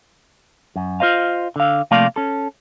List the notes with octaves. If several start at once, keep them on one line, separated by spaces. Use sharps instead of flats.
F#2
F4 F#4 C5 D#5 F5
D3 F5
C3 F3 A3 A#3 D5 F5
C#4 A4